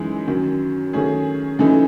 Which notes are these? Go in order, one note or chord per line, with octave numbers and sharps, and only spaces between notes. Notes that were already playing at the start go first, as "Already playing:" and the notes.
Already playing: F#2 E3 G#3 D#4 G#4
F#2 D#3 F#3
D#3 F#3 A3 C#4 G#4
F#2 C#3 E3 A3 D#4